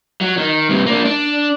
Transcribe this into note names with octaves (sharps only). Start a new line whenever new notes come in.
F#3
D#3
G2 C3
A#3 D4
D4